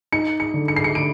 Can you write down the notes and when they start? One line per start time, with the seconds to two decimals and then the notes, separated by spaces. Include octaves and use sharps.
0.12 D#4 C#7
0.40 C#7
0.54 D3
0.68 C#7
0.76 C7
0.84 C#7
0.95 D3 D7